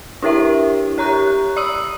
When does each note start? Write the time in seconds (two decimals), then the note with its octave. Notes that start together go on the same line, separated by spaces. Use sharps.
0.22 D4 E4 G4 A#4 C#5 E5
0.98 G4 C#5 A#5 C#6 F#6
1.56 D5 D#6 E6 D#7 F#7